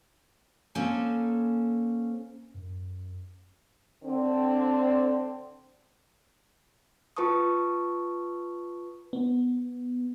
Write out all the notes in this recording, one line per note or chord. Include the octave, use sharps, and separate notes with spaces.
A#3 C#4 A4 C5 G#5
F#2
D3 C4
F4 B4 A5 C#6 D#6
B3